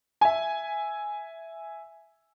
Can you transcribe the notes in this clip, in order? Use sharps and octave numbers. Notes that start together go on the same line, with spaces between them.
E5 G#5